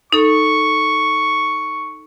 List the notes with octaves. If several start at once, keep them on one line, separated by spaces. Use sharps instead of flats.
D#4 A4 C#6